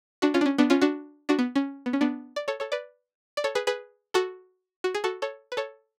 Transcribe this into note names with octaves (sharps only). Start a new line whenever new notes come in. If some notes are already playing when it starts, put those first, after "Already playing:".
D4 F#4
C#4 F4
D4
C#4
B3 D4
C#4 F4
D4 F#4
D4 F#4
B3
C#4
B3
C#4
B3 D4
D5
A4 C#5
A4 C#5
B4 D5
D5
A4 C#5
G#4 B4
G#4 B4
F#4 A4
F#4
G#4
F#4 A4
A4 C#5
B4
A4 C#5